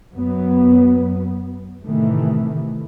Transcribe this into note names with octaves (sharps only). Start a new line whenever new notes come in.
F#2 F#3 B3
A2 C3 D#3 E3 A3